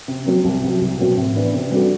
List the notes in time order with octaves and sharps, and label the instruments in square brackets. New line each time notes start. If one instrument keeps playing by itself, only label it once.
[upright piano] C3
F#3 C4
C2
C3 F#3
C2
B2 F#3 C4
A2
E3 B3 D4
C3
G3 D4 F#4 A4